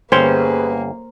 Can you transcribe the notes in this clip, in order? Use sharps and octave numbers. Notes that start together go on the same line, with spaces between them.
G1 A#3 C#4 G#4 B4 C5 G5